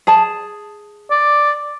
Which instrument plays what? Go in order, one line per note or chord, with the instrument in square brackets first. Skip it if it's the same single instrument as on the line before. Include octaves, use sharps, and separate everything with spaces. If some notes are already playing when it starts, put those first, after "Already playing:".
[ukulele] G#4 A5
[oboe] D5